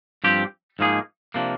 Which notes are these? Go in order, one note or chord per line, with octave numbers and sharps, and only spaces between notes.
G2 F3 C4 G4
G#2 F3 A#3 D#4 G#4
C3 F3 A#3 D4